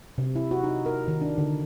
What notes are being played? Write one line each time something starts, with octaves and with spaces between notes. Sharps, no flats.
C3
E4
F#4
D#4
A#4
D#3
D4
D3